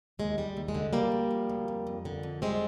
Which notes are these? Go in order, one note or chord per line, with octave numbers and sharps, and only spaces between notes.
D#2 G#3
G3
D#2
G#3
D3
D2 G3 A#3
D2
F3
D2
F2
F2
D3
F2
G3 G#3 C4